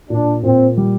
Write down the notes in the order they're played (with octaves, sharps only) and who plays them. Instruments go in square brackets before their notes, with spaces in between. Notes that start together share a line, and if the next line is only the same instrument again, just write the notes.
[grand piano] A#2 [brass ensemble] D4
[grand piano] A#2 [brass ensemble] C4
[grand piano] G3